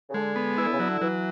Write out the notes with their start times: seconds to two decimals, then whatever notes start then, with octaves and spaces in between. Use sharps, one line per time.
0.09 C#3
0.14 D3 G#3
0.36 B3
0.57 E3 E4
0.65 D3
0.72 C#3
0.79 D3 F#3
1.01 E3 F#3